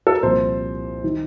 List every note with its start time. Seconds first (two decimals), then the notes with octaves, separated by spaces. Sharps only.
0.07 A4
0.15 A#4
0.23 C2 A#2 F3 C5
1.04 D#3